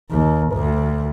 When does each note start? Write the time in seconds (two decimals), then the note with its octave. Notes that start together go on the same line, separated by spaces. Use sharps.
0.10 D#2
0.53 D2